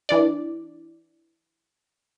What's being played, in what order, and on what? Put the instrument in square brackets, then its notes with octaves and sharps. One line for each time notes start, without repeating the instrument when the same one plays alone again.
[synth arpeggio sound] E3 D4 D5